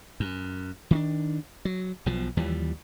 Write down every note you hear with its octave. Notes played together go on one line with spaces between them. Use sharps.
F#2
D#3 C4 D4
F#3
B1 B2 F3
D#2 E3 F3 G3